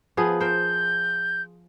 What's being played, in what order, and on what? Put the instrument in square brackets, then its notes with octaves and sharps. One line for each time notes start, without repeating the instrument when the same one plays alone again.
[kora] F3 B3 G#4
[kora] A#4 C5 [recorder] G6